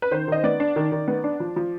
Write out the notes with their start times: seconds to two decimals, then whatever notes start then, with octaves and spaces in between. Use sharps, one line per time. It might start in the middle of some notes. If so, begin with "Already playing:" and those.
0.02 B4
0.11 D#3 C5
0.28 D#3 D#5
0.44 B3 D5
0.60 D4
0.76 D#3
0.92 D#3
1.08 B3
1.24 D4
1.40 F3
1.56 F3